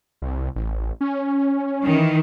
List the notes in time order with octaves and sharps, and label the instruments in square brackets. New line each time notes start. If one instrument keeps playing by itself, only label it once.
[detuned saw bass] C2
A1
C#4
[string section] D#3 E3